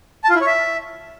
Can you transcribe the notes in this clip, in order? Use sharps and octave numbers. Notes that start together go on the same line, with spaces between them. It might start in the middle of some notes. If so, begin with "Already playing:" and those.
A5
F4
E4
C#5
E5